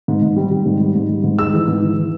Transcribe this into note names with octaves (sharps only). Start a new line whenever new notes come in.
G#2
G#2
G3
G3
G#2
G3
G#2
G3
G#2
G#3 E6
E3
G#2
E3
E3